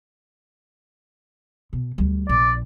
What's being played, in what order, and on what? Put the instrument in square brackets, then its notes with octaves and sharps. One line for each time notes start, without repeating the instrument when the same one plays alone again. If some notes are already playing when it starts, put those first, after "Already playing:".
[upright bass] B2
D2 G3
[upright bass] A#1 [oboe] D5